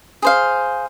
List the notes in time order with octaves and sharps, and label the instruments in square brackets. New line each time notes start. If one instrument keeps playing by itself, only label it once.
[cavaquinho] G#4 C5 F5